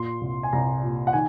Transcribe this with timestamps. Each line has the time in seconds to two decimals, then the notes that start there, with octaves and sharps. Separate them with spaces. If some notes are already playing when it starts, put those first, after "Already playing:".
Already playing: A#2 C6
0.21 C2
0.43 G#5
0.53 C2 A#5
0.83 A#2
1.07 F#5
1.13 D#3 G#5